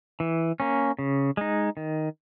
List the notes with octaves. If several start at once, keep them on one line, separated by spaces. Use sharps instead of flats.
E3
A#3 C#4
C#3
G#3 D#4
D#3